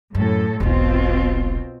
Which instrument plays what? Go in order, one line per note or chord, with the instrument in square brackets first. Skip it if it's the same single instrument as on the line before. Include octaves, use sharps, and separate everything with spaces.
[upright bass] F#2 [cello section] A2 A4
[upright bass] E1 B1 [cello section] B2 C4 F4